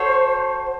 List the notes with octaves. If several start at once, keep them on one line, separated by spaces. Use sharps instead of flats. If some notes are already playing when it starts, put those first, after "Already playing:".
Already playing: F#4 A4 C5 C#5